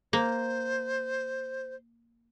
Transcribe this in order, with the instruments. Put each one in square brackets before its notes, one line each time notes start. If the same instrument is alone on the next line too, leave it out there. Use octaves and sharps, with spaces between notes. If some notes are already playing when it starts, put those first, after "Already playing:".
[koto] A#3 [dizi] C5